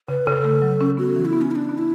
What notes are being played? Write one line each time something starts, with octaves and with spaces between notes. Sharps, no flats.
C#3 B4
C#3 A4
A3
F#3
C#4
B3 F#4
E3
E4
B3
C#4
B3 D4 E4
B3
E4